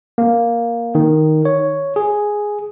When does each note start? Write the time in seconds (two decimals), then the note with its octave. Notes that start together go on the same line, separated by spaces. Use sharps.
0.18 A#3
0.95 D#3
1.45 C#5
1.96 G#4